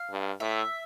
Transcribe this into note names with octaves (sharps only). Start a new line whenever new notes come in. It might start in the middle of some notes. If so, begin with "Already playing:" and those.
Already playing: F5
G2
A2 E5